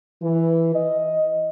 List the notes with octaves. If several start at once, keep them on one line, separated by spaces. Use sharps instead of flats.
E3
D#5